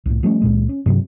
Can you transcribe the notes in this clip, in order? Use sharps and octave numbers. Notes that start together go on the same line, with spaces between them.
C2 A2
F3 G3 A3 C#4
C#2 A#2 G#3
C#4
G2 C3 F#3